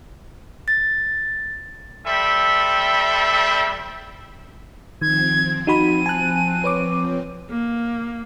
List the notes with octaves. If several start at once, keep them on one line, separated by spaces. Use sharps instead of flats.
A6
G3 C4 A4 E5 G5 B5
D#3 F3 C4 G#6
D#4 F#4 B5 D#7
G#5 A5 F#6
B4 C#5 D6
A#3